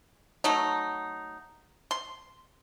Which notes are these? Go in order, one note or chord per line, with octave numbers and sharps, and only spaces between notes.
F#3 A3 D#4
C6